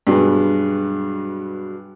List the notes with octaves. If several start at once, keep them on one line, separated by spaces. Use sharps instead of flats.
G2 B2 F#3 G#3